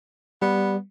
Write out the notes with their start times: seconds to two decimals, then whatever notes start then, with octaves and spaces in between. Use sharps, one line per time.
0.42 G3 B3